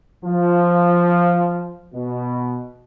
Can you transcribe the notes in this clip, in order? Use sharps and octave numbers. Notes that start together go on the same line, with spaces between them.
F3
B2